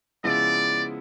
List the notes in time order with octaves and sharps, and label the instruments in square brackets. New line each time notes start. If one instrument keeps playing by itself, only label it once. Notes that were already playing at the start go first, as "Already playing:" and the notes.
[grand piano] C#3 F3 G#3 B3 E4 [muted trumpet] D5